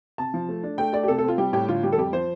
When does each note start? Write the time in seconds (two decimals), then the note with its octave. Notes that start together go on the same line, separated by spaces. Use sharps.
0.18 C3 A5
0.34 F3
0.49 A3
0.63 D4
0.78 A3 G5
0.93 A3 D5
1.03 G4
1.08 C3 A4
1.18 A4
1.24 C4 F4
1.38 G3 G4
1.53 A2 G4
1.68 D3 F4
1.83 G3 G4
1.92 A4
1.98 F2 G4
2.13 F3 C5